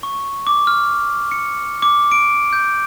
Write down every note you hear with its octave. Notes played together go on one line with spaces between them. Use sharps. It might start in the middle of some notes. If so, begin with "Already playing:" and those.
C#6
D6
F6
C#7
D6
D7
G6